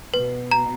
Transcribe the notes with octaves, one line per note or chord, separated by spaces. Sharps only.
B2 B4
A#5